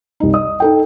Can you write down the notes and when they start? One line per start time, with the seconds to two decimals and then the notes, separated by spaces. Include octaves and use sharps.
0.20 C2 D#4
0.34 D#5 D#6
0.60 D#4 A4 G5